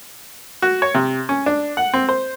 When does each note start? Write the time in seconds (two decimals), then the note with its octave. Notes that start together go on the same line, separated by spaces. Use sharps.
0.62 F#4
0.82 C#5
0.94 C3
1.29 C#4
1.46 D4
1.77 F#5
1.94 C4
2.09 C5